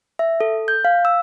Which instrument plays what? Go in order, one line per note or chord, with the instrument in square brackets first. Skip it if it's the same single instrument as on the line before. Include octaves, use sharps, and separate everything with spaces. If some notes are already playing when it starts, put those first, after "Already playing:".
[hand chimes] E5
A4
G6
F5
E6